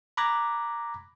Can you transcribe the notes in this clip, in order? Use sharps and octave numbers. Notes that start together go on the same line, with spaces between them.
A#5 B5 D6 F#6 G#6 A#6